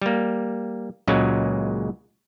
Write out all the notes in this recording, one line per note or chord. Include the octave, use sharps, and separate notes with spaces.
G3 A#3
C#2 A#2 C#3 F#3 G#3